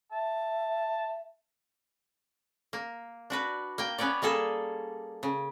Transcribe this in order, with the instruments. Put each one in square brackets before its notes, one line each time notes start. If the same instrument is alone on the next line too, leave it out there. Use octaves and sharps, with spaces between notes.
[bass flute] E5 [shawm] A5
[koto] A#3
D4 F#4 B4
A#3 G5
B3 C#4 B4 C#5 D5
G3 A#3 G#4 A4
C#3